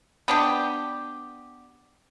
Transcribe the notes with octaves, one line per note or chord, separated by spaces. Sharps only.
B3 D4 G4